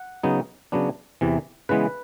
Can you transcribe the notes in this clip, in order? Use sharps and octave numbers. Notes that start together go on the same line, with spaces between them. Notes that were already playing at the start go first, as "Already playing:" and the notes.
Already playing: F#5
C#3 F#3 B3 D#4
C#3 F#3 B3 D4
E2 C3 E3
C#3 E3 G#3 B3 B4